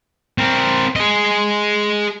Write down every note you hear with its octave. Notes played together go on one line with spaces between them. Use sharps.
C4 A#4
G#4 D#5